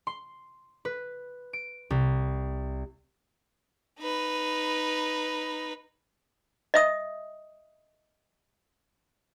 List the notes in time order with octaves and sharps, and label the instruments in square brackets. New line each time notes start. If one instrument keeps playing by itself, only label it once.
[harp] C6
B4
D7
C2
[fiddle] D#4 B4
[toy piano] D#5 E5 D#6